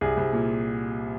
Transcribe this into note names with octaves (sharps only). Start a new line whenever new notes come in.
C2 G#4
C2
A#2